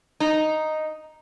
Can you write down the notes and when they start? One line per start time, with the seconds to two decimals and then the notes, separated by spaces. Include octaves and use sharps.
0.20 D#4